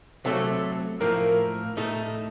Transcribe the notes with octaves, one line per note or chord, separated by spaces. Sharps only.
C3 F#3 A3 A4
A2 F3 A#3 A#4
A2 A3 D#4 A4